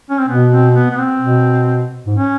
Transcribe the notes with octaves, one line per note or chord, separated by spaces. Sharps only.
C#4
C4
B2 B3
C4
B3
B3
C4
B2
G#2
C#4